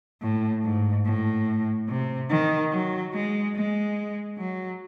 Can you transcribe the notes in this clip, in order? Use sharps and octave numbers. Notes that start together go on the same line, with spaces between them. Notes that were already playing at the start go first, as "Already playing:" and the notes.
A2
G#2
A2
C3
D#3
F#3
G#3
G#3
F#3